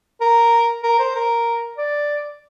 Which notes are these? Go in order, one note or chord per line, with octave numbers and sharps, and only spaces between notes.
A#4
A#4
C5
A#4
D5